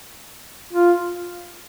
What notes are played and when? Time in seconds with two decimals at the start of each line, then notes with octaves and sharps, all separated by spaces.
0.73 F4